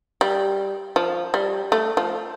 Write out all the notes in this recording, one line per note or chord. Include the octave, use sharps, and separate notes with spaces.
G3
F3
G3
A3
F3